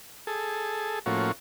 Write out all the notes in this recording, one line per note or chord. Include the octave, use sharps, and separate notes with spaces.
G#4 A4
A2 F3 A#3 C#4 F#4